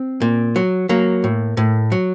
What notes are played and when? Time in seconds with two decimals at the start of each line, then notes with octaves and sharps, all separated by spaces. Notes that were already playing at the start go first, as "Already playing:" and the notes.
Already playing: C4
0.22 A#2
0.56 F#3
0.89 F#3 A#3
1.24 A2
1.57 A2
1.92 F#3